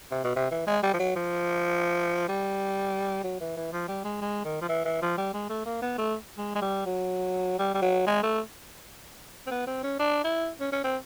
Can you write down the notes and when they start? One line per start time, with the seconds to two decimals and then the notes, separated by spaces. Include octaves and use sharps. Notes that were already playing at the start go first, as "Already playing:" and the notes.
0.11 C3
0.24 B2
0.36 C3
0.51 E3
0.67 G#3
0.83 G3
0.93 F3
0.99 F#3
1.16 F3
2.28 G3
3.24 F#3
3.40 E3
3.57 E3
3.72 F3
3.88 G3
4.04 G#3
4.21 G#3
4.45 D#3
4.61 F3
4.69 E3
4.85 E3
5.02 F3
5.17 G3
5.34 G#3
5.49 A3
5.65 A#3
5.82 B3
5.98 A3
6.38 G#3
6.55 G#3
6.62 G3
6.86 F#3
7.59 G3
7.74 G3
7.82 F#3
8.07 G#3
8.23 A3
9.47 C4
9.51 B3
9.67 C4
9.83 C#4
9.99 D4
10.24 E4
10.60 C#4
10.72 C#4
10.84 C4